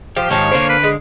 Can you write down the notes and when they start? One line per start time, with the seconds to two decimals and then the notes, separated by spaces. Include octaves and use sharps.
0.17 F3 G4 C5
0.30 G#2 D#3 F3 G4 C#5 A5
0.52 D3 A#3 C#4 D4 C5
0.69 B4
0.83 G#3